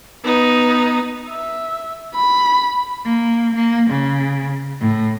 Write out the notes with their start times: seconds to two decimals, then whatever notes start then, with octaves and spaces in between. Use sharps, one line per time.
0.24 B3 D#4
1.29 E5
2.15 B5
3.05 A#3
3.55 A#3
3.90 C#3
4.81 A2